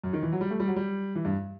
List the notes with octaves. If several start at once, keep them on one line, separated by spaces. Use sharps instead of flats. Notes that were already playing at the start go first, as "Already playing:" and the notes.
F#2
D#3
E3
F#3
G3
A3
G3
F#3
G3
E3
G2